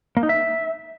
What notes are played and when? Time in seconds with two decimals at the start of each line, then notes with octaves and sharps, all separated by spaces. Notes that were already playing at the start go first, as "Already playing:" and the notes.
0.17 A#3
0.23 D#4
0.29 E5